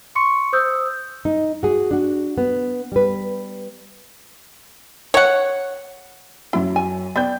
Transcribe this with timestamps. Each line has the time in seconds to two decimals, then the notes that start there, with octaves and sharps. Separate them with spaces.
0.15 C6 C#6 C#7
0.53 C5 D#6 E6 G6
1.25 D#4
1.63 F#4 G#4
1.91 D4 F#4
2.38 B3
2.92 G3 B4
5.14 C#5 F#5
6.53 F#2 F#3 E4
6.76 G#5
7.16 B3 D5 G5 G6